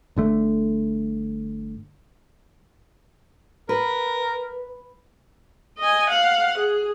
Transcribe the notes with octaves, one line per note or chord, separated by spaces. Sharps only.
G1 D3 A3
A#4 B4
D#5 G#5
F5 F#5
G#4